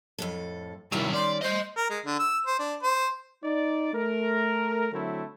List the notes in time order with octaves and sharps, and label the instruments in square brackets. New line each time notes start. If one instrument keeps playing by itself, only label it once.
[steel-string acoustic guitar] F2 A2 A4
[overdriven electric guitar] C3 F#3 [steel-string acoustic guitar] D#3 G3 C#4 [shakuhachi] E4
[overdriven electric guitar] D5 [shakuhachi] C6
[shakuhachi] C5 [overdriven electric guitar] D#5 C6
[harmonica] A#4
G#3
D3
E6
C5
D4
C5
[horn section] D#4 D5
A3 A#4
D3 F#3 A3 C4 E4